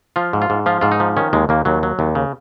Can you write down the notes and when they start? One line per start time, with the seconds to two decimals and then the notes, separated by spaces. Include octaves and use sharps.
0.16 F3 F4
0.33 G#2
0.42 F4
0.50 G#2
0.66 F3 F4
0.81 G#2 F4
0.92 D#4
1.00 F3
1.17 D#3 C#4
1.33 D#2 G#3
1.49 D#2 A#3
1.65 D#2 F#3
1.83 F#3
1.99 D#2
2.15 C#3